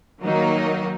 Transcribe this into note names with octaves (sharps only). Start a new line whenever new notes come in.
D#3 F#3 A#3 D#4